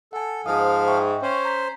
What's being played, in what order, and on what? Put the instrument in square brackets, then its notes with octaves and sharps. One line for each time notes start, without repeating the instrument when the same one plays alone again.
[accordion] A4 [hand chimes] F#5 G#5
[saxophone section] G#2 [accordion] F3 F5 [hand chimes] D#6
[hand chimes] E5 G5 C#6
[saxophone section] C#4 [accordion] C5
[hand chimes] A#5 G6 B6